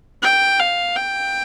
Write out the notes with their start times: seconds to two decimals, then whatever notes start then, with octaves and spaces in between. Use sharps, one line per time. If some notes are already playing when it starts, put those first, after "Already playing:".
0.22 G5
0.60 F5
0.96 G5